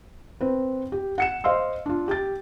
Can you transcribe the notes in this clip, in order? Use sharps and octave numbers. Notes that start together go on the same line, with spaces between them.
C4 B4
G4
F#5 C#7 E7
C5 D#5 F5 C6 E6
D4 F4
G4 A6